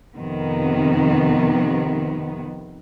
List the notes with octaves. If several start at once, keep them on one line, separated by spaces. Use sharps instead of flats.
F2 C3 D#3 B3